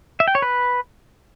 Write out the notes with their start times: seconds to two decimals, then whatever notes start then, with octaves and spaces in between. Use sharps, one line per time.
0.20 E5
0.28 G5
0.35 C#5
0.42 B4